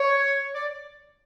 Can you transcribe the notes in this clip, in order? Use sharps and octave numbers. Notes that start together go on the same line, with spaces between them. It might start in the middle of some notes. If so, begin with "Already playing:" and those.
Already playing: C#5
D5